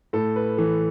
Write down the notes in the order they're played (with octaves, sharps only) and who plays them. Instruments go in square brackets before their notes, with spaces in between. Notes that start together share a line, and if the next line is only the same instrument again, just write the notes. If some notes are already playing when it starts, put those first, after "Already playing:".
[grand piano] A2 A4
B4
E3 A3